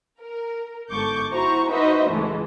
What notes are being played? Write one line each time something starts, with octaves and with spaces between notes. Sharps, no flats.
A#4
G1 G#2 A4 C#6 D6 G6
E4 F#4 C5 A#5 C#6
D#4 F#4 B4 C5 D#5 E5
C#2 A2 E3 G#3 A3